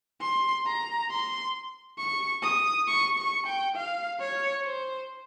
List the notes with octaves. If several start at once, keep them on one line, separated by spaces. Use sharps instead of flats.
C6
A#5
C6
C#6
D#6
C#6
C#6
G5
F5
C#5
C5